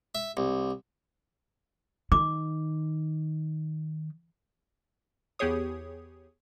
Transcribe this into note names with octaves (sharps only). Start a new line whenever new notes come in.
E5
C2
D#3 D6
E2 B3 G4 G#4 C#5 D#6